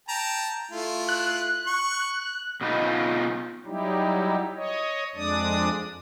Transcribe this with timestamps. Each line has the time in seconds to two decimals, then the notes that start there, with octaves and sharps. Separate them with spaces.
0.09 G5 A5 A#5
0.71 A3 E4 F4
1.09 F#6
1.67 C#6
2.61 B2 B3 D#4 F4
3.66 F#3 G3 D#4 E4 G4
4.56 C#5 D#5
5.15 F2 G#3 D4 D5 D#6